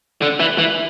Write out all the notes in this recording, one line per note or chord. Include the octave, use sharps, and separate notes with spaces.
D3
E3
E3